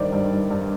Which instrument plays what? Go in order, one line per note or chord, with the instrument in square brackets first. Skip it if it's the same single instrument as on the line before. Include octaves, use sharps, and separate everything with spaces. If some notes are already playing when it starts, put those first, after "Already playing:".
Already playing: [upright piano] G2 D#3 G3 C5 D5
G2
G2
G2